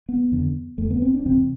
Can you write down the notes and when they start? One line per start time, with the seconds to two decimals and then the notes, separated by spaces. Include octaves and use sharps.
0.09 B3
0.32 F2 D3
0.78 F2 D3 A3
0.90 B3
1.02 C4
1.14 D4
1.26 E2 C3 C4